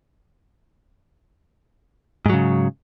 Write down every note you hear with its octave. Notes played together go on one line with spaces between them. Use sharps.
G#2 C#3 F#3